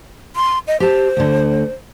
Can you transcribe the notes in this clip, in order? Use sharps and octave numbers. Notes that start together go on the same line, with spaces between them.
C6
D#5
G4 C5 A5
D2 D3